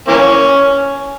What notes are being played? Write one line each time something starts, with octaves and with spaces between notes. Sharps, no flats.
E3 A#3 C#4